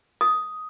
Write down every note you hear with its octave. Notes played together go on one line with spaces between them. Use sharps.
D#6